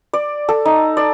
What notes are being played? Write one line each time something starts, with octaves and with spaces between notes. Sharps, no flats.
D5
A4
D#4
D5